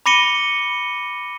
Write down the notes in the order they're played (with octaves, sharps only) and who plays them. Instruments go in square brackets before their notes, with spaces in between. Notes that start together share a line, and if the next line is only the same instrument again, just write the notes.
[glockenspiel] B5 D6 A#6 C#7 D#7 G7